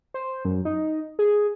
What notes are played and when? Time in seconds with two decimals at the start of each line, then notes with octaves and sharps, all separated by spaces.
0.14 C5
0.45 F#2
0.65 D#4
1.19 G#4